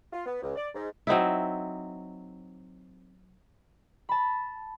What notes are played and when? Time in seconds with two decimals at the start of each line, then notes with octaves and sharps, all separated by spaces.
0.13 F4
0.26 B3
0.42 C#2
0.56 D5
0.75 G#2
1.07 F#3 C4 D#4 E4
4.09 A5 B5